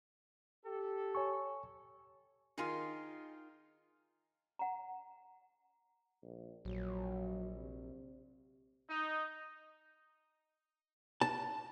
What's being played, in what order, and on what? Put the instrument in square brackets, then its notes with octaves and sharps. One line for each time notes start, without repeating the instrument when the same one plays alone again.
[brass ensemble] G4 A4
[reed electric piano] C#5 G#5 C#6
[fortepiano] D#3 F4 [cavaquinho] D#4 G#4 C6
[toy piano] F#5 A#5
[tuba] A#1
[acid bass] A#1 [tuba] F#3
[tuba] C3
[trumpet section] D#4
[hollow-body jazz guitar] A5